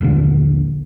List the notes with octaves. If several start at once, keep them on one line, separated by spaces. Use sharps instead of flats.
D#1 A#1 A#2 D3